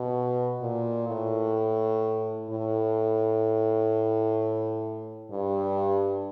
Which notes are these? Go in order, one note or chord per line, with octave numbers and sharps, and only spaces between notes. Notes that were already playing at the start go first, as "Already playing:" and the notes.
Already playing: B2
A#2
A2
A2
G2